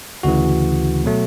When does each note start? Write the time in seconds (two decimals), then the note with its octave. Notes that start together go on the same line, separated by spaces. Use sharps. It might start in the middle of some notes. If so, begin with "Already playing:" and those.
0.23 D2 C#3 E3 F#4
1.04 B2 F#3 A3